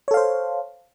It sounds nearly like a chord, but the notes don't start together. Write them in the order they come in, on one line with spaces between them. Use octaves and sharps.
C#5 A4 F5 C5